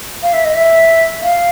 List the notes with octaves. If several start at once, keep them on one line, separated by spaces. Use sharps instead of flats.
F5
E5
D#5
E5
F5